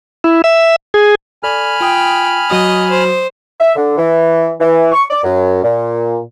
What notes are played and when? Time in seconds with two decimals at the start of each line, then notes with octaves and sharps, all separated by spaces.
0.24 E4
0.44 E5
0.94 G#4
1.43 A4 D5 G#5 B5 F6
1.80 F4 G5 D#6
2.50 F#3 F#4 D#5 D#6
2.90 C5
3.60 E5
3.76 D3
3.97 E3
4.60 E3
4.92 C#6
5.11 D5
5.23 F#2
5.63 A#2